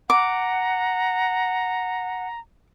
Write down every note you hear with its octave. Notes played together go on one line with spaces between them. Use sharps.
F#5 A#5 D6